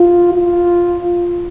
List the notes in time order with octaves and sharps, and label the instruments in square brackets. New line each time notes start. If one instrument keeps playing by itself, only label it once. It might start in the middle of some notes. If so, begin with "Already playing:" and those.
Already playing: [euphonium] F4
F4